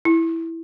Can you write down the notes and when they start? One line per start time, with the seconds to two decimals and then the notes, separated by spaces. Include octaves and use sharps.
0.05 E4